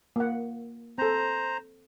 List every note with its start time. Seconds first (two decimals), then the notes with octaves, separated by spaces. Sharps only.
0.16 A#3 F#5
0.98 C4 A4 C5 A#5